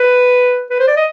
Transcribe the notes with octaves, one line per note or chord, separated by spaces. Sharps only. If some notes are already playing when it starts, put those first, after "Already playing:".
Already playing: B4
B4
C5
D5
D#5